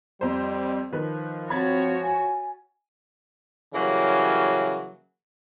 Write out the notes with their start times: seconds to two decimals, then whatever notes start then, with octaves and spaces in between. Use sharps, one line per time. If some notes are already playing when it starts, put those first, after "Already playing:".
0.21 F2 G3 C5
0.93 D#3 F3 B4
1.50 C4 F#4 C#5 B5 G#6 A6
2.02 G#5
3.74 C#3 E3 F#3 G3 A#3